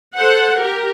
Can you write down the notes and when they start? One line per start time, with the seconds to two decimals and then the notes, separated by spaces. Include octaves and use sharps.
0.15 A4 C5 F#5
0.59 G4 A#4